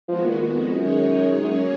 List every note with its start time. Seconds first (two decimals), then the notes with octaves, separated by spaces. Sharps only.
0.08 D#3 F3 G#3 B3 F#4
0.25 A#2
0.42 A#2
0.59 F2
0.76 F#2 D#3 G#3 D#4 G#4 C#5
1.43 F#2 F#3 A#3 C#4 G#4 C#5